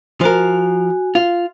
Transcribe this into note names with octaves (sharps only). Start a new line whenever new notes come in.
F3 F#4 A#4 G#5
F4